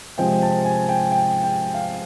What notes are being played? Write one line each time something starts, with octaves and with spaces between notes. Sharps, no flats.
C3 F3 G#3 C4 G5
A5
G#5
G5
G5
G5
F5